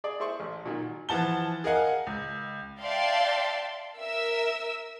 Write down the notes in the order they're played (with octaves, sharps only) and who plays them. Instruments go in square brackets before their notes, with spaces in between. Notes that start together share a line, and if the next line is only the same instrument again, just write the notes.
[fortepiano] G#4 D5
E4 G#4 C5 C6 C#6
A1
A#2 D#3 F#3
[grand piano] E3 F3 F#5 A5 G7
G#4 A#4 D#5 F5 F#5 G#5
C#2
[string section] D5 E5 F5 G5 A5 C6
A#4 E5 E6